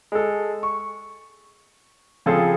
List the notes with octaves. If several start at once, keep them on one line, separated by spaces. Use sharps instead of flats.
G#3 A4
C#6
C#3 F3 C4 F4 G#4 A4